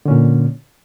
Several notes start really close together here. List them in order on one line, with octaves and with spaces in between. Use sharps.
D3 C#4 A#2